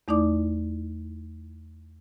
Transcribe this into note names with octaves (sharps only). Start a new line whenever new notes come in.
E2 A3 D#4 E4 D5 D6